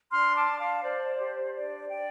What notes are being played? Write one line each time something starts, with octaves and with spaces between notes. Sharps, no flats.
D4 C6 F6
A5 D6
D4
F5 A5
C5 D5
G4
D4 D5
D4 D5 G5